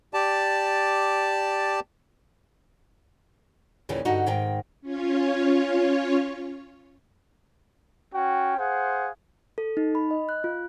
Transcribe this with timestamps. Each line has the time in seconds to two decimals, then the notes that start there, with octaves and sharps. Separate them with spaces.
0.14 G4 D5 A5
3.89 D#2 A#2 C#3 E3
4.05 G2 D3 D#4 F#4
4.26 G#2 D#3 G5
4.82 C#4 F4 C#5
8.13 C#4 F#4 G5
8.58 G#4 C5 F5 F#5
9.58 A4
9.77 D#4
9.95 B5
10.11 D#5
10.29 F#6
10.44 F4